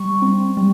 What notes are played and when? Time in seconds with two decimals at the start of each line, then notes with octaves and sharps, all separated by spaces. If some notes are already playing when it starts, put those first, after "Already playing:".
Already playing: G3 C#6
0.22 C4
0.57 G3